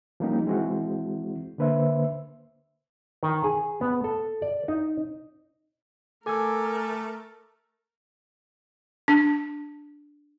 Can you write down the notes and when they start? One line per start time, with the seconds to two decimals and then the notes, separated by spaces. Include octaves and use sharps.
0.20 F3 G3 A#3 C#4 D#4 G4
0.46 E3 G#3 C4 E4 F#4
1.58 D3 A#3 B4 C5 E5
3.23 D#3
3.44 G#4
3.81 B3
4.04 A4
4.42 D5
4.68 D#4
6.26 A3 A4 A#4 G#5 D6 E6 G#6
9.08 D4